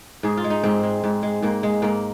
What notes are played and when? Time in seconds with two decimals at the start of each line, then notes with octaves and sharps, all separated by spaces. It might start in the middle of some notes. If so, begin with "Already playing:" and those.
0.23 G#2 G#4
0.37 F4
0.44 G#3
0.50 D#4
0.63 G#2 C4
0.83 G#3
1.04 G#2
1.23 G#3
1.43 G#2 A#3
1.63 G#3
1.82 G#2 A#3